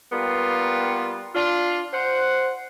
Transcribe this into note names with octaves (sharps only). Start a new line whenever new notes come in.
G3 A#3 B3 F4
D4 F4
C5 F#5